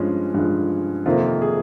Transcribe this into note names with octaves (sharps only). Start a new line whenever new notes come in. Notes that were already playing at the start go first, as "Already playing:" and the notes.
Already playing: G2 F3 G#3 C#4
G2 F3 G#3
F2 C3 D#3 A#3 F4
G#4